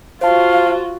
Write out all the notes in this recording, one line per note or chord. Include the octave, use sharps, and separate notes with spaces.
F4 F#4 C5 F5 A5